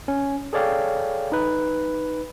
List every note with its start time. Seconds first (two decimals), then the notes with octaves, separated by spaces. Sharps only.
0.08 C#4
0.53 G#4 A4 C#5 D5 F5 G5
1.32 D#4 B4